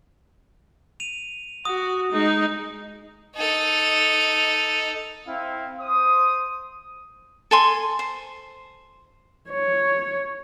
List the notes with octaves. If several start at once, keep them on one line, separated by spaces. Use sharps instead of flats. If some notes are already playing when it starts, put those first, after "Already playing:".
D#7 F7
F#4 D#6
G#3 D#4
D#4 A4
C4 E4 F5
C5 D#6
A4 G#5 C6
C5
C#5